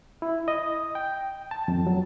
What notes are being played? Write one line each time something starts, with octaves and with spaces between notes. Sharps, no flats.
E4
D#5
G5
A5
F2
F#3